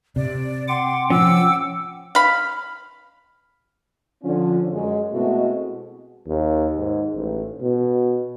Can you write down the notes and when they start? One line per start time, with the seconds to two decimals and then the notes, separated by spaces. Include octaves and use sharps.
0.16 C3 D5
0.68 F#5 G5 C6 D6
1.10 F3 C#4 E6
2.15 F5 B5
4.23 D3 F3 C#4
4.72 F#2 G#3
5.12 B2 G#3 A3 C4 E4 F#4
6.27 D#2
6.78 G#2
7.14 A1
7.61 B2